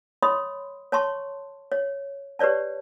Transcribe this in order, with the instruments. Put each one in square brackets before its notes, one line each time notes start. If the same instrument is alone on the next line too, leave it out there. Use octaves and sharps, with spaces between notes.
[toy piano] C#5 D#5 B5 C6 D#6
C#5 A5 C6 C#6
C#5
G4 B4 C#5 D5 A5